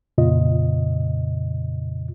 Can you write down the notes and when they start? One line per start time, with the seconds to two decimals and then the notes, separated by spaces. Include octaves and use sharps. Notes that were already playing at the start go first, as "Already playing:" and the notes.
0.18 F2 A#2 C#3 F4 D#5